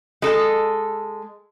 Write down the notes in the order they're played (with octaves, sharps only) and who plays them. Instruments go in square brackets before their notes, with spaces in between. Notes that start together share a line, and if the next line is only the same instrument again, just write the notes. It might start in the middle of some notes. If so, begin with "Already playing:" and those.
[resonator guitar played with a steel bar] G#3 A4